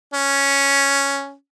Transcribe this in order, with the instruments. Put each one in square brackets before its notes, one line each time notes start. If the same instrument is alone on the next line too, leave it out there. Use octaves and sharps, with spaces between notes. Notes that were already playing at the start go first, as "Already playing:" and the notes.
[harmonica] C#4